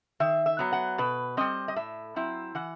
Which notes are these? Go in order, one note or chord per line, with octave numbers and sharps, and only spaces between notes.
D#3 E5
E5
F#3 B3
F#5
B2 B4
G3 C4 D#5
D#5
A2 E5
F#3 C4 E4
E3 F#5